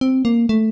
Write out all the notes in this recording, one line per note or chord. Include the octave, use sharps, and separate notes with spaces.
C4
A#3
A3